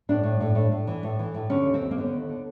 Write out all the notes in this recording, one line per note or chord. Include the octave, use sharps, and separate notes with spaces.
A2 D4
A2
A2
A2
A2
E3
A2
E3
A2
D3 C#4
D#2
C4
D#2
A#3
D3 B3
D#2
D3